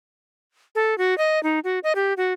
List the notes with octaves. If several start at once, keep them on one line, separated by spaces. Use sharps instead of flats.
A4
F#4
D#5
D#4
F#4
D#5
G4
F#4